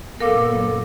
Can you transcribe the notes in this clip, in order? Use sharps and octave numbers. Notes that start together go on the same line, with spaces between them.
F#2 A#2 B3 A4 A#4 F5 D6